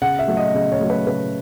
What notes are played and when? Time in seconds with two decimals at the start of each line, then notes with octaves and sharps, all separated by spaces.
0.02 C#3 F#5
0.19 E5
0.28 F#3 A3
0.37 D#5
0.54 C#3 D#5
0.72 C#5
0.80 F#3 A3
0.90 B4
1.07 C#3 B4